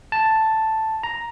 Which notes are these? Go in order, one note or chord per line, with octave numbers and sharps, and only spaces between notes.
A5
A#5